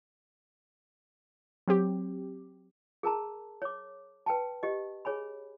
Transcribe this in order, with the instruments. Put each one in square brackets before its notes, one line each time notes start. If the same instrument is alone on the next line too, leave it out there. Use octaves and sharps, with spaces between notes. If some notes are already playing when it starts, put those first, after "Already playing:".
[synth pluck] F#3 C4 G4
[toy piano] G#4 A#4 A5 A#5
C#5 D6
B4 G5 A5
G4 D#5
G#4 C#5 G#5 B5